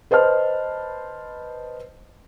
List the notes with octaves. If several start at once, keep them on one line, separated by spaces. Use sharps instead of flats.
B4 C5 D#5 A5 F6